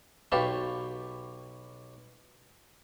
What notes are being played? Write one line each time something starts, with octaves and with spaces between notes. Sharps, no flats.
B1 G4 B4 F5 A5 C#6